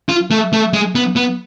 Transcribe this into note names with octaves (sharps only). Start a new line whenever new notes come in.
F4
A3
A3
G#3
B3
B3